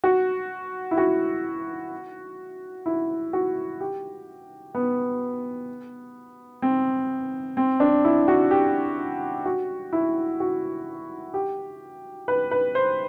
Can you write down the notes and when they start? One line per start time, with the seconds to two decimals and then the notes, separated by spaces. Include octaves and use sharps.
0.04 F#4
0.91 E4
0.98 F#4
2.86 E4
3.33 F#4
3.80 G4
4.75 B3
6.62 C4
7.57 C4
7.80 D4
8.05 E4
8.28 F#4
8.51 G4
9.45 F#4
9.93 E4
10.40 F#4
11.34 G4
12.28 B4
12.51 B4
12.75 C5